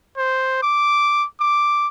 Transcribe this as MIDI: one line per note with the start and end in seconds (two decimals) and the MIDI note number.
0.17 0.58 72
0.63 1.26 86
1.40 1.88 86